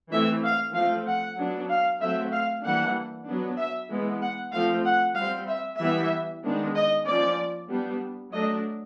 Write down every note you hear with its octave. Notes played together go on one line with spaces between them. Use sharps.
E3 A3 C4 E5
F5
F3 A3 C4 F5
F#5
F#3 B3 D4
F5
F#3 A3 C4 E5
F5
E3 G3 A#3 D4 F#5
F#3 B3 D4
E5
E3 G#3 B3
F#5
F3 A3 C4 F5
F#5
G3 C4 F5
E5
E3 G3 B3 E5
D#3 G#3 B3 D4
D#5
F3 A#3 C#4 D5
G3 B3 D4
F#3 A3 D4 D#5